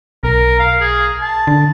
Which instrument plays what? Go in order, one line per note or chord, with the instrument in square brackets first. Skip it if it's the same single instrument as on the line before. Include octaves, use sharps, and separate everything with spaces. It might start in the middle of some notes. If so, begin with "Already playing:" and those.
[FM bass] B1 [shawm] A#4
[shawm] F5
G#4
A5
[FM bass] D3